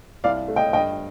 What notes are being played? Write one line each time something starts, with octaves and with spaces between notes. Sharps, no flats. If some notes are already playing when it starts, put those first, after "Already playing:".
C2 D5 F5
A3
D#5 G5
G2 D#5 G5